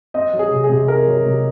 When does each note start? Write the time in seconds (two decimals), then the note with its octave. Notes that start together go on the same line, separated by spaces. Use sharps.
0.14 C4 D#5
0.33 F#3
0.39 G#4
0.52 C3
0.64 G#4
0.70 C3
0.88 C4 A#4
1.07 F#3
1.26 C3